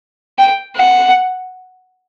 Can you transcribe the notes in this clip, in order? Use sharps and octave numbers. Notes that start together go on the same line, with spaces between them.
G5
F#5